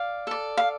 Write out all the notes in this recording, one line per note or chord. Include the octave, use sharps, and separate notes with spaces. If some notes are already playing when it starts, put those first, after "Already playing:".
Already playing: D5 F5
A4 D5
F5